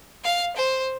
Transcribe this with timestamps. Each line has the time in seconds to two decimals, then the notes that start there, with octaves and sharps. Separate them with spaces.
0.24 F5
0.56 C5